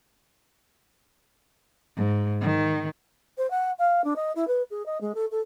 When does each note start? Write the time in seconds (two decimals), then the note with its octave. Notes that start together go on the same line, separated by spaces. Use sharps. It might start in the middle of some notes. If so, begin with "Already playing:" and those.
1.97 G#2
2.42 D#3
3.38 C5
3.51 F#5
3.79 F5
4.04 D4
4.16 D#5
4.36 E4
4.48 B4
4.71 G#4
4.86 D#5
5.01 G#3
5.15 A4
5.31 A4